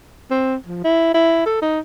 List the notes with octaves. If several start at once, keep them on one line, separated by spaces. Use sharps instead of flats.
C4
F3
E4
E4
A4
D#4